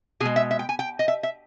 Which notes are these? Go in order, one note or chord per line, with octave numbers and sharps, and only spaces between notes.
B2 G#3 G#4
E5
E5
G5
G#5
G5
D#5
E5
E5